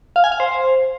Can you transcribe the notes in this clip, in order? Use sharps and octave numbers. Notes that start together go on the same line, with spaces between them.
F5
G#5
F5
C5